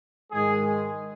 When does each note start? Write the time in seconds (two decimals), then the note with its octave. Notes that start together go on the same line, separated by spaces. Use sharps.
0.31 G#2 D#3 G#3 G#4